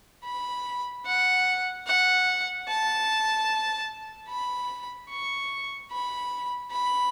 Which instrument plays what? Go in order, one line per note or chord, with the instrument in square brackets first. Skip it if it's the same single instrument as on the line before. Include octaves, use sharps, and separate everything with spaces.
[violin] B5
F#5
F#5
A5
B5
C#6
B5
B5